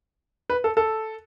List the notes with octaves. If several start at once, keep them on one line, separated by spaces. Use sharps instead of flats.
B4
A4
A4